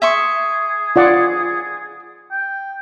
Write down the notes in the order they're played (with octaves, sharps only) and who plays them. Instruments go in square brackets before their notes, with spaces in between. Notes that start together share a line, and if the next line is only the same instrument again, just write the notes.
[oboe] G#4 [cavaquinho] E5 C6 C#6
[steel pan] F4 D5 F#5
[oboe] G5